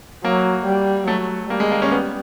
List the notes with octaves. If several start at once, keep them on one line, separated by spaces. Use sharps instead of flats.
F#3 A#3
G3
F#3 A3
G3 A#3
G#3
A#3
C#4
B3